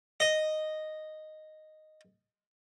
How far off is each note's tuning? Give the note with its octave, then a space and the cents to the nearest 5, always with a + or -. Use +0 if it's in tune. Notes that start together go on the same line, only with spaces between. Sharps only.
D#5 -5